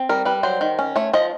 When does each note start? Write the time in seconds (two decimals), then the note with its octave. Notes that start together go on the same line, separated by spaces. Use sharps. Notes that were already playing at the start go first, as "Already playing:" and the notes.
Already playing: C4
0.09 G3 A#4
0.25 G3 B4
0.43 F#3 C5
0.61 D#3
0.79 C#4
0.96 A3 C#5
1.13 F3 D#5